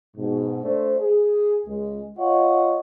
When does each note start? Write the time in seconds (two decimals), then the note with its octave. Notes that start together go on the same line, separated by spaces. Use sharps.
0.16 G#2 B2
0.63 A3 D4 C5
1.00 G#4
1.67 C#2 G#3
2.18 F4 C#5 D#5 F#5